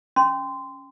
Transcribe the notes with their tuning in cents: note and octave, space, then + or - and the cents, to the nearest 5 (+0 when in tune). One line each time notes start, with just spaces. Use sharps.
C#4 +0 C6 -20